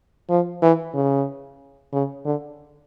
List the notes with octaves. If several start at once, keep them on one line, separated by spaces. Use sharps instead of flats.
F3
E3
C#3
C#3
D3